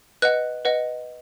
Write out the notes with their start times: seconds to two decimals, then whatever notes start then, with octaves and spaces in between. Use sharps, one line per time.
0.22 B4 D#5 F#5 F#6
0.65 B4 D#5 F#5